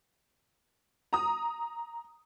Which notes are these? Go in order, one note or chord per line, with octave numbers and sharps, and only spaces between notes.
A#5 D#6